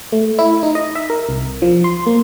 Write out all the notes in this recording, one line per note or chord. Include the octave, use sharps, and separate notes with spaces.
A3
E4
D#4
D#5
E5
A#4
C2
F3
C6
A#3